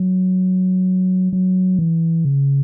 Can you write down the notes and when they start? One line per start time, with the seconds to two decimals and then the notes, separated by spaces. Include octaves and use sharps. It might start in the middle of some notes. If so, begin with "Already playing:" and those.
Already playing: F#3
1.33 F#3
1.79 E3
2.25 C#3